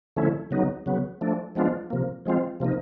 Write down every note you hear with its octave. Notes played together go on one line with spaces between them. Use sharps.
D3 F3 A3 C#4 E4
C#3 F#3 B3 D#4
C#3 F#3 B3
F3 A3 D4
F3 G#3 B3 D4 F4
C3 F3 A#3
F3 G#3 C4 F4
C3 F3 A#3 D#4